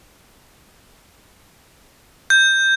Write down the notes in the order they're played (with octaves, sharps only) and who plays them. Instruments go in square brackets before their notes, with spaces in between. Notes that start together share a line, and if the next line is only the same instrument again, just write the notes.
[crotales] G6